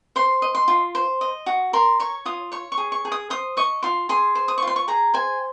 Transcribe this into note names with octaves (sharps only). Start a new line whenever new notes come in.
C5 C6
D#5
C6
F4
C5
D#5
F#4
A#4 C6
C#5 C#6
F4 D#6
C#5 C#6
C#6
G#4
C#6
G#4
D#6
C5 D#6
D#5 C#6
F4 C6
G#4 C6
C5
D#6
C#6
F4
C6
C#6
G#4 A#5
C5 G#5